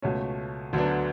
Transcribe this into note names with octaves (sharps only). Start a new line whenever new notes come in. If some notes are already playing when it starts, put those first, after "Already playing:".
C#2 B2 A3 C#4
D2 D3 F#3 B3 D4